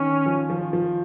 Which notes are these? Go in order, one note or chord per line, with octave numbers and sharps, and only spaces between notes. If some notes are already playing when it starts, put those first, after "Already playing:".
Already playing: D#3 C#4
F3
F3
F3